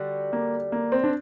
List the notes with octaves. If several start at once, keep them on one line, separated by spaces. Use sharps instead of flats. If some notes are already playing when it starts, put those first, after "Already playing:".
Already playing: D3 G3 F#4
A#3
A#3
C4
D4